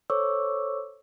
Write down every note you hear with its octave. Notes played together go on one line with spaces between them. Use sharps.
A4 C5 C#5 C#6 D6 E6